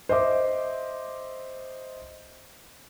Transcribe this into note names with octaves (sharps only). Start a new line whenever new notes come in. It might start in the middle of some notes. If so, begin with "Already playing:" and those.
C5 D#5 E5 D6